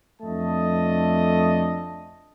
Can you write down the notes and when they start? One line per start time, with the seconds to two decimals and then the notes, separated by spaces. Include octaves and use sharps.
0.22 F2 A3 D4 D#5 A5